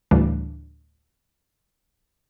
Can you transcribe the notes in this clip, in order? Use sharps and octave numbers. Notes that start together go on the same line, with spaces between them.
D2 A2 C#3 E3 G3 D4